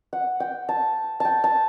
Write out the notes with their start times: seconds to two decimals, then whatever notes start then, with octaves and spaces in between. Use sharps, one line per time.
0.13 F#5
0.40 G5
0.69 A5
1.20 G5 A5
1.44 A5